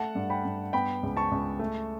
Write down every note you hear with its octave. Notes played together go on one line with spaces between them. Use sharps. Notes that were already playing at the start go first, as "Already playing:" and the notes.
Already playing: A3 F#5 A5
G2
G5 B5
G2
B3 G5 B5
C#2
A5 C#6
C#2
A3